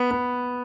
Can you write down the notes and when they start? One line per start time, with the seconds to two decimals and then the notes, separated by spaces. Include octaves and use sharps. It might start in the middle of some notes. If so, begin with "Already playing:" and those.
Already playing: B3
0.11 B3